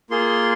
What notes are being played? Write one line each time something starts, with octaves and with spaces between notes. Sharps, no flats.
A#3 F4 G#4 C6